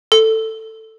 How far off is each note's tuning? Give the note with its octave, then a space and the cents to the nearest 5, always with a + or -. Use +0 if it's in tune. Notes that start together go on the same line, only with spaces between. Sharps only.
A4 +10